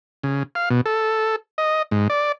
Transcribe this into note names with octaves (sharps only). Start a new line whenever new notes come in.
C#3
F5
B2
A4
D#5
G#2
D5